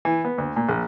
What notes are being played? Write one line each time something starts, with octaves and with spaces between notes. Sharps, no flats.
E3
B3
D2
A#2
A#1